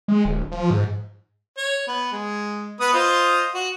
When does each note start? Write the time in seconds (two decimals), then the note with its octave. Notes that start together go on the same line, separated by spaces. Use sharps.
0.08 G#3
0.25 D1
0.52 F3
0.70 G#2
1.57 C#5
1.87 B3
2.12 G#3
2.80 B3 B4 D#6
2.93 F4 C5 D#5
3.54 F#4